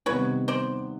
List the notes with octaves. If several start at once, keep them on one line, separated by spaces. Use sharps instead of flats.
C3 D#3 G3 B3 D#4 B4 C#5
C5 D5